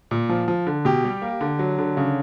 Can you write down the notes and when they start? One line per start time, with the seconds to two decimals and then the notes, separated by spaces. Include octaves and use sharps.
0.11 A#2
0.29 F3
0.48 F3
0.67 D3
0.85 B2 G4
1.04 G3
1.22 A#3
1.41 D3
1.59 F#3
1.78 D3
1.97 C#3